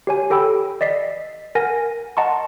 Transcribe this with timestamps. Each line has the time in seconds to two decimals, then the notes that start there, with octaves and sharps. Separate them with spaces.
0.07 G4 C#5 G#5
0.30 G4 A4 G5 B5 E6
0.81 D5 D#5 B6 C7
1.55 A#4 F#5 G#5 A#6
2.17 D#5 F#5 A5 A#5 C6 C#6